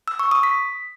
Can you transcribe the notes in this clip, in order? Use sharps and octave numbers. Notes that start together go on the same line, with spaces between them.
E6
C#6
D#6
B6